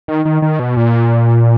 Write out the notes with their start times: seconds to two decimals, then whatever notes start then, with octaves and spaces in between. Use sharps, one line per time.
0.08 D#3
0.25 D#3
0.42 D#3
0.60 B2
0.77 A#2